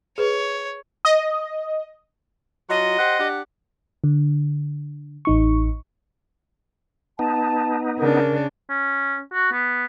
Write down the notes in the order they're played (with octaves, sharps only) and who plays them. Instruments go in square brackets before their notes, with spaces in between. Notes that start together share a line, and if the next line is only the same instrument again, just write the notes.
[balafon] G#4 B4 [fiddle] C#5
[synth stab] D#5
[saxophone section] F#3 F4 F#4 [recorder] D#5
[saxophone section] G4 C5 F#5
D4 G4 F#5
[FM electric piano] D3
A1 D#4 C#6
[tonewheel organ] B3 D#4 [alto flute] A5
[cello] C#3 D4 [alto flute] A#4
[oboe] C#4
F#4
B3